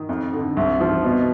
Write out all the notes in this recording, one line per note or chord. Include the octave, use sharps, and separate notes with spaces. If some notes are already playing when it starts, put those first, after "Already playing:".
Already playing: D#3
F2
D3
C2
F3
B2